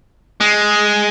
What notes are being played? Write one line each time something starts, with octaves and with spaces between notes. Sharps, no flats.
G#3